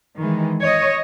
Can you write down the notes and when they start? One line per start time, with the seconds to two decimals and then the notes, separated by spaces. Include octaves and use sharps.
0.17 D#3 E3 G#3
0.61 C#5 D#5